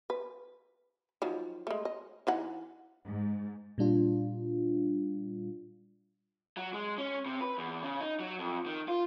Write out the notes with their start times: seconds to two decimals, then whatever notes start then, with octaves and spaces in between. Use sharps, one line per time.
0.10 B4
1.22 D#3 F3 F#3
1.67 G#3 A3
1.85 D#5
2.27 E3 D#4 F#5
3.06 G#2
3.78 A#2 G3 D4 F4
6.57 F#3
6.74 G#3
6.98 C#4
7.26 C3
7.41 B4
7.58 E2
7.83 C#3
8.01 D#4
8.20 F#3
8.39 F2
8.66 D#3
8.88 F4